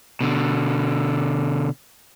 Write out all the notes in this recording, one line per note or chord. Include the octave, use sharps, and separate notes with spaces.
B2 D3